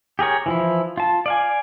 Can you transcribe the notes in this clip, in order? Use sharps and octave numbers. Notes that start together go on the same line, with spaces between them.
G4 G#4 A#4 C#5
E3 F3 E4
F4 A5
D5 F5 G#5